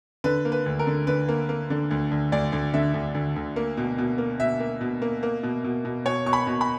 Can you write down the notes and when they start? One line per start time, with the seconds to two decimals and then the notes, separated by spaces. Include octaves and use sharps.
0.24 D3 B4
0.45 A#3
0.52 B4
0.66 D2
0.79 A#4
0.87 D3
1.07 D3 B4
1.29 A#3
1.49 A#3
1.70 D3
1.91 D2
2.11 D2
2.32 D2 D5
2.52 D2
2.73 D3 E5
2.94 D2
3.15 D2
3.36 D2
3.56 A#3
3.77 B2
3.98 B2
4.18 A#3
4.40 B2 E5
4.60 A#3
4.81 B2
5.02 A#3
5.23 A#3
5.43 B2
5.64 B2
5.85 B2
6.06 B2 C#5
6.26 B2 C#6
6.33 B5
6.47 B2
6.61 B5